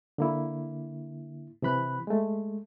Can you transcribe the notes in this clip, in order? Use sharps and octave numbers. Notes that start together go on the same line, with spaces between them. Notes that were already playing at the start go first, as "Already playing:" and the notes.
D3 A#3 E4
C3 E3 B5 F#6
G#3 A3